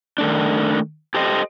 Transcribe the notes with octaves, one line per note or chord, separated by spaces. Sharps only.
D#3 A3 D4
G4 A4 C5 D#5